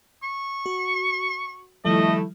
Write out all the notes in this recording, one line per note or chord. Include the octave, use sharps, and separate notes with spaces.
C#6
F#4
D#3 F3 G3 A3 E4 D#5